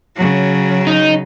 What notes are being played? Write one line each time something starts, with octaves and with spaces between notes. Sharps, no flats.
C#3 F#3
D#4